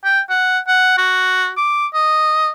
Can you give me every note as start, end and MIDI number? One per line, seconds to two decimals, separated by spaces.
0.05 0.20 79
0.30 0.59 78
0.67 0.97 78
0.98 1.51 66
1.57 1.87 86
1.94 2.50 75